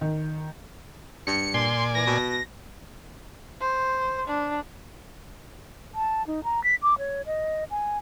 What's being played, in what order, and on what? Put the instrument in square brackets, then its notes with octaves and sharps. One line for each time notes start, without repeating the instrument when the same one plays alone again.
[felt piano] D#3
[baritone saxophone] G2 [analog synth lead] C#7
[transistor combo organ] A#2 D5 G#5 [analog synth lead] C6
[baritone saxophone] E3 [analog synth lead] A#6
[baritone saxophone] B2
[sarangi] C5
D4
[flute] A5
D#4
A#5
B6
D6
C#5
D#5
G#5